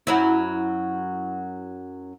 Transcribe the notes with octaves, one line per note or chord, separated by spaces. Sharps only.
F#2 F#3 E4